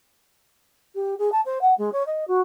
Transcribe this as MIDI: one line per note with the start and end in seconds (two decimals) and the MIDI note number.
0.95 1.15 67
1.19 1.32 68
1.32 1.41 81
1.46 1.59 72
1.62 1.74 78
1.78 1.90 56
1.93 2.03 73
2.07 2.25 75
2.28 2.41 66